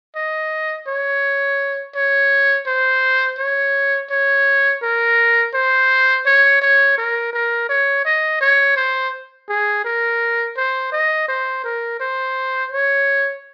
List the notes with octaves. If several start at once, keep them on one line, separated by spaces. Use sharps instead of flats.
D#5
C#5
C#5
C5
C#5
C#5
A#4
C5
C#5
C#5
A#4
A#4
C#5
D#5
C#5
C5
G#4
A#4
C5
D#5
C5
A#4
C5
C#5